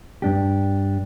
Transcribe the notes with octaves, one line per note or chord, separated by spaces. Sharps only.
G2 D4 G4